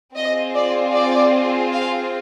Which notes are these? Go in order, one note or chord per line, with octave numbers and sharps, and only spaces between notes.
C4 F4 G#4 D#5
D5
D5
F5